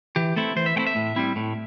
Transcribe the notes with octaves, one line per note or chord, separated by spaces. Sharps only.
E3 G4
A3 C4 E4 A4
E3 C5
E5
A3 C4 E4 G5
E5
A2
G3 C4 E4
A2